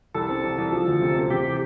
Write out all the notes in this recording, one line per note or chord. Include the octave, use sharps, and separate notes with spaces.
C2 A4
C4
C2
C2
F3
D2
C3
C4
C3 G4
E3